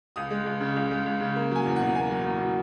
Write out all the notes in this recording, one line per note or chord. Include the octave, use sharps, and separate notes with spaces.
C#2 D#6
G#3
C#2
C#3
C#2
G#3
C#2
C#3
A#3
F#3 G#5
E2
F#5
B2
A#3 G#5
F#3
E2
B2